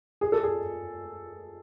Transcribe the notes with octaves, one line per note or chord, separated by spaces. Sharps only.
G#4
A4
G#4